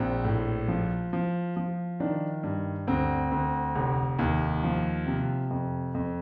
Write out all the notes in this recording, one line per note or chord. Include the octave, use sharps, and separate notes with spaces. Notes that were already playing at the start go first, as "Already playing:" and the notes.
Already playing: A#1 F3 C4
A2
F3
F3
F3
D#3 D4
G2
D2 C4
D2
F1
D#2
F3
C3
F2
F2